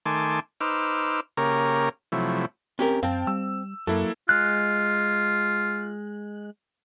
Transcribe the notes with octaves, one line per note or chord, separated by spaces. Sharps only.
D#3 A3 G#5 A5 C6 D6
D#4 B4 C5 D6 E6 F6
C#3 A#3 G4 A#4 C#5 A#5
C3 F3 F#3 A3 E4
C4 C#4 G4 A#4
F#2 C4 F5 G5 A5
G3 E6
F#2 F#3 A#3 E4 A4
G#3 F4 F#6